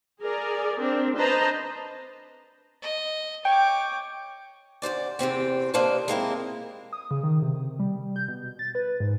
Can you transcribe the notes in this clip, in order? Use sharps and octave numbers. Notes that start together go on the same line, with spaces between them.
G#4 A#4 D5
C4 D4 A#4
B4 C5 D#5 A5 A#5
D#5
C#5 G5 D6
D2 G#2 C5 D5
E2 C3 C4 G4
A#3 D4 B4 C5 D#5
G#3 A#3 C4 E4
D#6
C#3
D#3
C3
G3
G6
B2
A6
B4
G#2